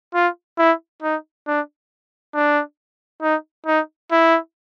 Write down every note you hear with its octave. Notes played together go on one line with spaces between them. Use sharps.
F4
E4
D#4
D4
D4
D#4
D#4
E4